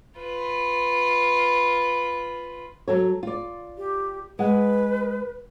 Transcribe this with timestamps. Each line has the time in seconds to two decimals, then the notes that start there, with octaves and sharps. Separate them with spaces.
0.18 F4 B4
2.88 F#3 A4 C#5
3.23 F4 D5
3.78 G4
4.39 G#3 B4 F#5